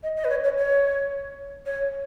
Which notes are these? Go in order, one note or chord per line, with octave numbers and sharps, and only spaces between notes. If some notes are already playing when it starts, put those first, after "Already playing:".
D#5
D#5
B4
C#5
C#5
C#5
C#5